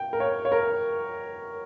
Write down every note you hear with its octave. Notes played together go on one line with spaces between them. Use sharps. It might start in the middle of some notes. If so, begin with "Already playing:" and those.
Already playing: G5
A#4
C#5
C#5
A#4